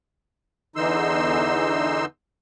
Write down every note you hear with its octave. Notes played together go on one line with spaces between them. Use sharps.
E2 D3 E3 D#4 C6 E6